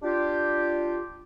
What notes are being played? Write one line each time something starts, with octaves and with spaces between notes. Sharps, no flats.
D4 F4 G4